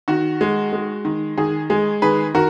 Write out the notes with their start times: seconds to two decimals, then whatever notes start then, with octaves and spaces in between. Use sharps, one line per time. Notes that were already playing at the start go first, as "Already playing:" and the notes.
0.08 D#3 F#4
0.41 G#3
0.73 G#3
1.05 D#3
1.37 D#3 G#4
1.70 G#3 G#4
2.02 D#3 G#4 B4
2.34 D#3 F#4 A#4